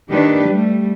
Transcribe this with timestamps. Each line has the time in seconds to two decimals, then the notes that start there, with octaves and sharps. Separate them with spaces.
0.11 D#3 A#3 D4 G4 B4
0.47 G3 A3